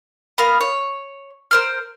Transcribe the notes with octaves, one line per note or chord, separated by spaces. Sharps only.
B3 A#4 F5
C#5
A#4 C5 F6